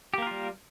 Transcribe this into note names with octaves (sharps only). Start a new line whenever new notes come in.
G3 A#3 F4 G4 A#4